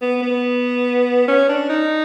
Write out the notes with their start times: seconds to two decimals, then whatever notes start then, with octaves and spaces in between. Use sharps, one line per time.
0.01 B3
0.23 B3
1.28 C#4
1.49 D4
1.69 D#4